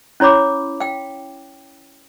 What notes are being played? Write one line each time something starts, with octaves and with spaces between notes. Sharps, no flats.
C#4 E4 C#5 B5 D6
F5 G5